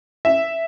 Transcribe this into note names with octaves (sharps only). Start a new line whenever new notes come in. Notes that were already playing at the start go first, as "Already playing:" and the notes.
E5